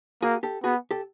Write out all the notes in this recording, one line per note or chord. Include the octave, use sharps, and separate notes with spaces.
A#3 F#4 G#4
G4 A4
B3 F#4 G#4
G4 A4